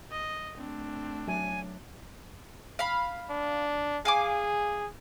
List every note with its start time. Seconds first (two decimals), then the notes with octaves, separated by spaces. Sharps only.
0.11 D#5
0.57 A3 C4 D4
1.28 F#3 E5 G#5
2.79 F5 B5
3.30 D4
4.05 G#4 F5 G#5 D6